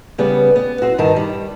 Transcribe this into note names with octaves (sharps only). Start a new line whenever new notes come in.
C#3 G3 B3
B3
C4 F#4
G2 D#3 D#4 A#4 A5
G3